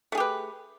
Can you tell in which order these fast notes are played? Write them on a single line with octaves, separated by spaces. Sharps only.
A3 G#4 G4 B4